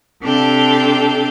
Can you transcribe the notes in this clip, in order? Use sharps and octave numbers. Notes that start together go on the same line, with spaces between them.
C3 D4 A4 F5 G5